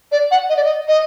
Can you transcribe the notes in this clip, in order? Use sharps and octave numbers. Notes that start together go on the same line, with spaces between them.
D5
F#5
D#5
D5
D#5
D#5